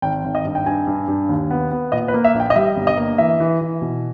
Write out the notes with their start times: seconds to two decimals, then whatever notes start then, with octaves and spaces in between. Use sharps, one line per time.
0.02 G#1 G5
0.24 G#1
0.35 D#5
0.45 G2
0.55 G5
0.66 G2 G#5
0.87 G2
1.08 G2
1.29 D#2
1.50 B3
1.71 B3
1.92 A#2 D#5
2.08 B4
2.14 A#3
2.24 E5
2.35 A#1
2.40 G5
2.50 D#5
2.56 G3 E5
2.76 G1
2.87 D#5
2.97 A#3
3.18 E3 E5
3.40 E3
3.61 E3
3.82 B2